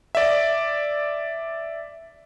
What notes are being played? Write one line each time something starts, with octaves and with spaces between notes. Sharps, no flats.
D5 E5